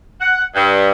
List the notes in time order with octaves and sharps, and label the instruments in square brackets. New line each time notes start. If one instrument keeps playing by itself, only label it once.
[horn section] F#5
G2